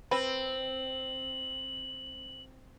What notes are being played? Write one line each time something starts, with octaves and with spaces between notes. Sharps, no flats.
C4 B4 F#7